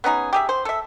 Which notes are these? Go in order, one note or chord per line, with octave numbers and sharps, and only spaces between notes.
B3 C#4 D#4 G#4
G4 G#4 E5
C5
A4 E5